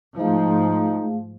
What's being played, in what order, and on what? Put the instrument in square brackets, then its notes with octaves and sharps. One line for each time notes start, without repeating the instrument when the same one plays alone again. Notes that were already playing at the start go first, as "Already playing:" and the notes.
[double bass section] G#2 F3 [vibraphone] A3 G#4 F5 [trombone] D#4